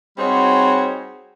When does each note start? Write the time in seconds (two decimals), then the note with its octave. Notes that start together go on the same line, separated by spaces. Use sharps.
0.18 G3 C4 D#4 F#4 G#4 C#5